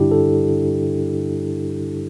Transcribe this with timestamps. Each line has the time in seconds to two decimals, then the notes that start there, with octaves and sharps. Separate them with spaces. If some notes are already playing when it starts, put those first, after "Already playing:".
Already playing: G2 D3 G3 D4 E4 G4
0.11 A4